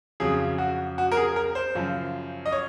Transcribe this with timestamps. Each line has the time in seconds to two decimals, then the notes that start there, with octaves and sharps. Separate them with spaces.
0.20 F2 C#3 F#3 G#4
0.58 F#4
0.98 F#4
1.12 A#4
1.17 G#4
1.36 A#4
1.55 C5
1.75 F#2 C#3 F3
2.46 D#5
2.52 C#5